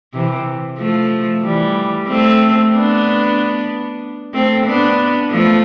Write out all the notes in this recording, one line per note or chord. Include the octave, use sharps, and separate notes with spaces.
C3 E3
F3 A3
E3 G3
A3 C4
B3 D4
A3 C4
B3 D4
F3 A3